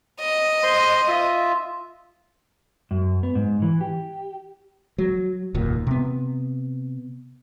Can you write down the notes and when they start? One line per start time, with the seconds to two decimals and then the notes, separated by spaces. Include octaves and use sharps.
0.21 D#5
0.63 C5 C6
1.08 F4 E5
2.91 F#2
3.23 B3
3.35 G#2
3.62 E3
3.81 G4
4.98 F#3
5.54 F1 D#2 A#2
5.87 C3 B3